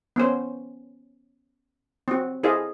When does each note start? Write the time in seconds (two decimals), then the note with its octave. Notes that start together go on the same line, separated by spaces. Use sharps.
0.16 B3 C#4 C5
2.08 C4 F#4
2.43 E4 G#4 A4 C5 D#5 F5